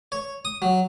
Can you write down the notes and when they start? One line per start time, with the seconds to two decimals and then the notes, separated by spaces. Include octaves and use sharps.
0.12 C#5
0.45 D#6
0.62 F#3